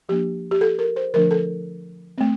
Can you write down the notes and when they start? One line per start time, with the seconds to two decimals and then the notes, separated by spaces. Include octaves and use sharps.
0.09 F3 A#3 D4 G4
0.51 G4
0.61 A4
0.79 A#4
0.96 C5
1.14 D3 F3 A3 D4 A#4
1.31 A4
2.18 A3 C4